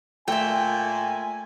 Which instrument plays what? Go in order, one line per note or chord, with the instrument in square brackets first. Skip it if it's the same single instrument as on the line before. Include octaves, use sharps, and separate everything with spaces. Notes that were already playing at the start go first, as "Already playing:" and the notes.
[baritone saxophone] A#2 [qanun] A3 [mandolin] E5 G5 [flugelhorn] G#5